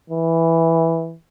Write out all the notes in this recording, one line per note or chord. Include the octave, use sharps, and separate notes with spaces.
E3